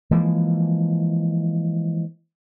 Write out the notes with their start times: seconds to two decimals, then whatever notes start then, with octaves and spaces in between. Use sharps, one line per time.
0.11 E3 F3 G#3 A#3